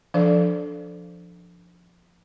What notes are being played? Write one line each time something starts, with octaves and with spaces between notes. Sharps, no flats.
F3 D4 A4 C5 D5